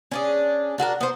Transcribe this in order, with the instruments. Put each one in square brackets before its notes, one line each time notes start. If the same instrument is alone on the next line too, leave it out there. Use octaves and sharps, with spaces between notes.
[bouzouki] C#4 D4 G#4
D4 F#4 G#4 A#4
B3 C5